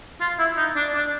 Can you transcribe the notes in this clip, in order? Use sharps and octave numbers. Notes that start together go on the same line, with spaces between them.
F4
E4
D#4
D4
D4